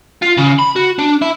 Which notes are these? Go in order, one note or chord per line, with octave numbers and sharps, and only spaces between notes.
F4
C#3
B5
F#4
D4
E4